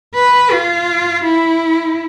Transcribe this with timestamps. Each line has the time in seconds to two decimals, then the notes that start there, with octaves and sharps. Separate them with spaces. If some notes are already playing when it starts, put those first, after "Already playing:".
0.15 B4
0.52 F4
1.23 E4